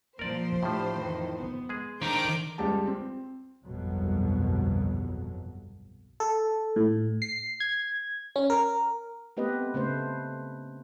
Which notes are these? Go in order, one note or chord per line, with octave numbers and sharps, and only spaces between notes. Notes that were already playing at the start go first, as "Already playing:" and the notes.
A#2 F3 A#4 C5 D5
A2 F3 A3 D4 G4
F2 D#3 E3
B3
G#3 G#4
D#3 D4 A#4 C5 D6 G6
C#2 G3 G4 G#4 A5
C4
G1 C2 F2 B2 F#3
A4
A2
C7
G#6
C#4
A#4
A3 B3 C4 G4 B4 D#5
C#3 A3 B4 C5